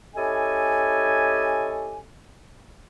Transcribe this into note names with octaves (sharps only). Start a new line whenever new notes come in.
C#4 E4 G4 A4 D#5 G#5